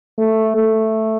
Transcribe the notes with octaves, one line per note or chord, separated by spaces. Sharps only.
A3
A3